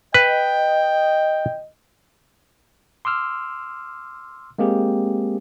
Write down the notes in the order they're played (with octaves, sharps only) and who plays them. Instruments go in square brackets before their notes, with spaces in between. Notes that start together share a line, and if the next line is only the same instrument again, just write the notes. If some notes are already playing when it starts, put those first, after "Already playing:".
[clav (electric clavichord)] B4 [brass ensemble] D#5 [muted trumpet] G5
[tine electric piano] C6 D6 E6 F6
G#3 A#3 C4 G4 G#4